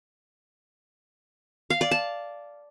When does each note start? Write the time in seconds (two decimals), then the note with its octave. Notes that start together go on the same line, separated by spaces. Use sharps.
1.70 F5
1.81 D5
1.91 A5